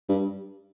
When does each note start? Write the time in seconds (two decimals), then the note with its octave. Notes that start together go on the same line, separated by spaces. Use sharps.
0.09 G2